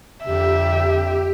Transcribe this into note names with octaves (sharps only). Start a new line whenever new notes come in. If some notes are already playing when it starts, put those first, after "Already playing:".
F2 D3 G4 E5